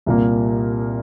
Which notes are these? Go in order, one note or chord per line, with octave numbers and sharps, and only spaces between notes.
C2 A#2 A#3